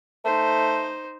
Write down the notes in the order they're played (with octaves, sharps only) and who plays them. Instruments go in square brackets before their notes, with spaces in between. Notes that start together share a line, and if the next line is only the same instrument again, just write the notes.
[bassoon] A3 [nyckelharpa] D#4 C5